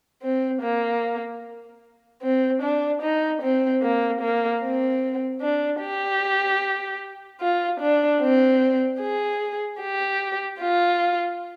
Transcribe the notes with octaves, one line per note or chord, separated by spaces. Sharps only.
C4
A#3
C4
D4
D#4
C4
A#3
A#3
C4
D4
G4
F4
D4
C4
G#4
G4
F4